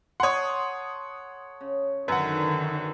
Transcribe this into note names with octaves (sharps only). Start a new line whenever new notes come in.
A4 C#5 F#5 C6 D#6
C#3
F#2 D3 D#3 B4 F#5
D#4 F#4